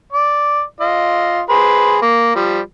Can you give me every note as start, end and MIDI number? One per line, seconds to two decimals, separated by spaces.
0.12 0.62 74
0.80 1.40 65
0.80 1.40 75
1.50 1.97 68
1.50 1.97 71
1.50 1.97 72
2.02 2.34 58
2.35 2.60 53
2.35 2.60 55